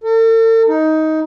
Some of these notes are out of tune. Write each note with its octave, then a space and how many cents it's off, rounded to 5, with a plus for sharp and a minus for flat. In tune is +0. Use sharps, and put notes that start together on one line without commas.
A4 +45
D#4 +15